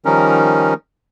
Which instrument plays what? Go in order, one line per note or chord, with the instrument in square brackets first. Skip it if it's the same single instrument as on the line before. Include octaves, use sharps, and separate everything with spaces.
[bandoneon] D#3 F3 G3 C#4 D#4 A#4